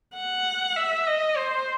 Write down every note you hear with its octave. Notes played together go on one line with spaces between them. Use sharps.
F#5
E5
D#5
C5